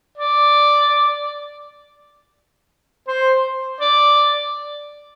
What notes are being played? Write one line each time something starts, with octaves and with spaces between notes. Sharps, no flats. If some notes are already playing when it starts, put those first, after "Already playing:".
D5
C5
D5